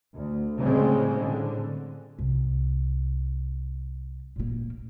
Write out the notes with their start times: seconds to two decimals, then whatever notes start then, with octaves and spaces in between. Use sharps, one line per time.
0.13 D2
0.60 A2 C#3 G3 G#3 C4
1.20 D3
2.19 C2
4.36 A#2 A#3